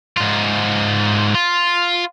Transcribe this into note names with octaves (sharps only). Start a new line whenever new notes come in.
G#2 F4
F4